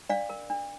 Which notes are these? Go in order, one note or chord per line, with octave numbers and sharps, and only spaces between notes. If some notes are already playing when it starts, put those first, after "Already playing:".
D4 D5 F5
A#4
D4